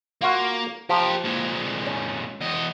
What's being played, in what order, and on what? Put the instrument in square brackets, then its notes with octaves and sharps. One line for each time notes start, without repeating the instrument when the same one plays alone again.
[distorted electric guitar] A#3 [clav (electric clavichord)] F4 F#4 F5
[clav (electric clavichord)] F3 [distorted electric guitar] G4 A#4
[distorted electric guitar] A#2 G#3
[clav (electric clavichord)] C#4
[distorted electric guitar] E2 D#5